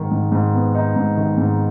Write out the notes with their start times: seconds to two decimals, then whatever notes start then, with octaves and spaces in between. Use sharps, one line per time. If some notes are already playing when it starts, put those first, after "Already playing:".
Already playing: G#2 D#3
0.11 G#2
0.32 G#2
0.53 B3
0.75 D#4
0.96 G#2
1.18 D#3
1.38 G#2